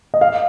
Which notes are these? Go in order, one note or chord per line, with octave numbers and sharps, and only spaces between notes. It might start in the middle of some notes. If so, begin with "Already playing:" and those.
D#5
F5